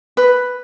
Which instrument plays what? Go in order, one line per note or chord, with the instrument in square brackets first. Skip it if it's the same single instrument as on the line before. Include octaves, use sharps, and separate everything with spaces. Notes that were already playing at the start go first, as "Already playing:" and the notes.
[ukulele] B4